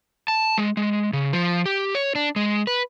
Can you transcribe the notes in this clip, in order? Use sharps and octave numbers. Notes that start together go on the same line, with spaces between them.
A5
G#3
G#3
C#3
F3
G4
C#5
D4
G#3
B4